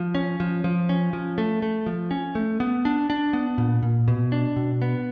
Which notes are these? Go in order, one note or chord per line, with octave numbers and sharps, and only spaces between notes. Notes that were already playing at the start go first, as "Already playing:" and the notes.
Already playing: F3
C#4
F3
F3
C#4
F3
A3
A3
F3
C#4
A3
B3
D4
D4
B3
A#2
A#2
B2
D4
B2
B3